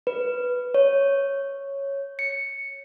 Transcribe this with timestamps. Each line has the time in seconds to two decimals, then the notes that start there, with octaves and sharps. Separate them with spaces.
0.07 B4
0.74 C#5
2.19 C#7